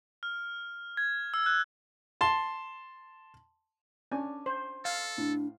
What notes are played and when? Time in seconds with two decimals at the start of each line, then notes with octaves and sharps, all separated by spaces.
0.23 F6
0.97 G#6
1.34 E6
1.46 F#6
2.21 A5 C6
4.12 C#4 D4 G#5
4.46 C5
4.85 A4 F5
5.18 A2 D4